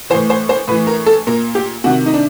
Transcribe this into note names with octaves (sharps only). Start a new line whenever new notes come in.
A2 E3 C5
C5
C5
A2 E3 B4
A#4
A4
A#2 A#4
G4
C3 D#3 F#4
D#4
D4